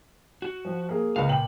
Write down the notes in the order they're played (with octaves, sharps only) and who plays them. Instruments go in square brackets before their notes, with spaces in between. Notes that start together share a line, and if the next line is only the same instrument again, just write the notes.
[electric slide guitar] F#4
[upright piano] F3
A#3 G#4
[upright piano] C#2 B4 [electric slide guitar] F5
[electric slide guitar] A#2 [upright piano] G5 F#7